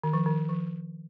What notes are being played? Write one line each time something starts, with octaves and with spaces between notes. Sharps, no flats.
D#3
F3
D#3
F3